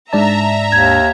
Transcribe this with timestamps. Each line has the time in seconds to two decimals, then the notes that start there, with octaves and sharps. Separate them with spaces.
0.13 G#2 D4 E5 A5 A#5
0.72 D#2 G#6